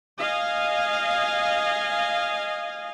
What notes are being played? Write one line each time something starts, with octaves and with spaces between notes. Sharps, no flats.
D#5 F5 G#5